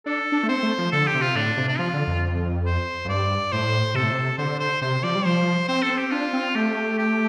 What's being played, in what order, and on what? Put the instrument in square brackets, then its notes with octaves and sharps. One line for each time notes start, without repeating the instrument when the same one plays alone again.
[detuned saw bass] D4 [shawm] A4
[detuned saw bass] D4
A3
[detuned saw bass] C4 [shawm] C5
[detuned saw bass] A3
F3
[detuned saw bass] D3 [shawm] A4
[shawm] G4
[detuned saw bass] C3
[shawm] F4
[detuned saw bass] A2 [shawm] D4
[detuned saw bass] C3
[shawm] D4
[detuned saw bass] F3 [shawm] F4
[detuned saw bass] D3
F2
[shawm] C5
[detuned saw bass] F2
[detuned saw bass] G2 [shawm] D5
[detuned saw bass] A2 [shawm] C5
[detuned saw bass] C3 [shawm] A4
[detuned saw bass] A2
C3
[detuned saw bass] D3 [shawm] C5
[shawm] C5
[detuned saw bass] C3 [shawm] C5
[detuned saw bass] F3 [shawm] D5
[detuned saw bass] G3
[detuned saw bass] F3 [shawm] C5
[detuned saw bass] C4 [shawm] C5
[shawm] A4
[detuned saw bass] C4
[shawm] G4
[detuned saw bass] D4 [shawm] F4
[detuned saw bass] C4
[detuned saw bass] A3 [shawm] G4
[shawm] G4